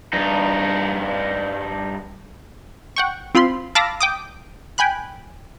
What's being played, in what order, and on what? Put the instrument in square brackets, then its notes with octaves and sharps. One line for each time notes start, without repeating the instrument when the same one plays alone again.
[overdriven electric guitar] G2 D#4
[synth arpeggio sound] F#5 G5 C#6
C4 F4 B5 C6
F5 A5 B5 D6 E6 A#6
G5 D6 D#6
G5 G#5 B5 F#6